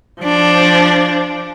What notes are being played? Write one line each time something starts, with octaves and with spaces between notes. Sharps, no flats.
F3 D4